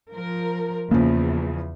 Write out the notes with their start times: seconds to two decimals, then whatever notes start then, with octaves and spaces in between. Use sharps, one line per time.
0.13 F3 A#4
0.91 E2 C#3 F3 A#3